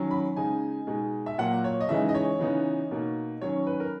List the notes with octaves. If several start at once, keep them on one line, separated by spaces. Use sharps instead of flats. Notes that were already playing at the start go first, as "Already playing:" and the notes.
Already playing: D#3 F#3 C#4
B5
C#3 G#3 D#4 G#5
B2 G#3 D#4
E5
A#2 F#3 A#3 F#5
C#5
D#5
C#3 E3 G#3 D#4 E5
D#5
C#5
C#3 E3 B3 D#4
B2 A#3 D#4
D#3 F#3 C#4 C#5
B4
A#4